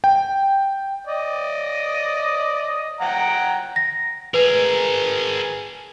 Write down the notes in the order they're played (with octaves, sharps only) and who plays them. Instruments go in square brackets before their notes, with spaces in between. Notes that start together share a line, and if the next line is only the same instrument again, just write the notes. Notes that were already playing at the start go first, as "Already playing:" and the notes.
[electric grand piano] G5
[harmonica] D5 D#5
F#5 G5 A#5
[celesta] A#6
[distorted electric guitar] G#4 A#4 [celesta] B4